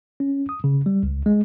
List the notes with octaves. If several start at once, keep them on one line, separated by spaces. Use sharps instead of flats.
C#4
D#6
C#3
G3
C#2
G#3